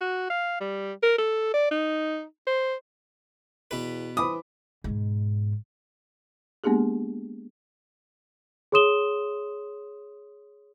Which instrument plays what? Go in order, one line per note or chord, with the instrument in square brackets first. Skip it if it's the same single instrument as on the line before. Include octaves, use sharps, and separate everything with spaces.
[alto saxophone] F#4
F5
G3
A#4
A4
D5
D#4
C5
[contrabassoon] E2 [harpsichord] B2 B4
[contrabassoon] E3 [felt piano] C5 B5 D6 [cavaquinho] D#6
[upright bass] G#2 B2
[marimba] G#3 A#3 B3 D4 G4 G#4
[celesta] G#4 C#5 C6 D#6 E7 G7